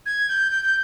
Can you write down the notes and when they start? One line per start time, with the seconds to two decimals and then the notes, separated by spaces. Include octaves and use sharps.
0.06 G#6
0.29 G6
0.52 G6
0.64 G6